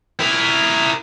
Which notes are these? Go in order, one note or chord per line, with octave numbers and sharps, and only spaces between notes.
E4 A#4